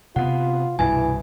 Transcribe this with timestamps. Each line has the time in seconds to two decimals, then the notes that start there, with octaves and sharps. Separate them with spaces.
0.16 C3 B3 F4 F#5
0.79 C2 G2 B2 E3 G#5